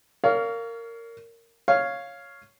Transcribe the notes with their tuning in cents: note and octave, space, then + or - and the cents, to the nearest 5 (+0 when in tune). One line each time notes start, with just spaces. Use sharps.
A#4 -15 C#5 +35 F5 +0
C#5 +0 F5 +0